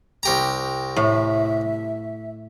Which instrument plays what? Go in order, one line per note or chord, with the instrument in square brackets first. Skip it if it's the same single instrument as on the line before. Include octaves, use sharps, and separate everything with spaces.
[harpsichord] C2 G4 A#5
[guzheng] A2 [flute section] E5